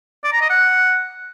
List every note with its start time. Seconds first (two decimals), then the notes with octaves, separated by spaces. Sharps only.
0.24 D5
0.33 A#5
0.41 D#5
0.50 F#5